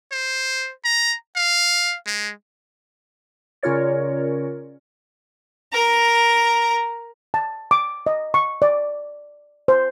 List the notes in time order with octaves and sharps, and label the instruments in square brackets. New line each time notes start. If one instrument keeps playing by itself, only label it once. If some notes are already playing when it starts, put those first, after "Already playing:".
[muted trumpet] C5
A#5
F5
G#3
[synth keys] C#3 C#4 F4 A#4 C#5 D5
[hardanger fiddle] A#4 A#5
[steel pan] A5
D6
D#5
C#6
D5
C5